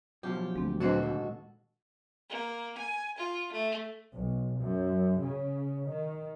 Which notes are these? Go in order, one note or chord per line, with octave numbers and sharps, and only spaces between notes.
F#2 B2 F3 G4
D2 G#3 C4
A#2 F#3 G#3 C4 D4 F#4 A4 B4
D#2 G#2
A#3
G#5
F4
A3
B1
F#2
C#3
D#3